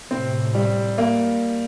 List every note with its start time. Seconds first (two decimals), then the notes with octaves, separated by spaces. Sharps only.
0.10 A2 C3 C4
0.54 G3
0.98 A#3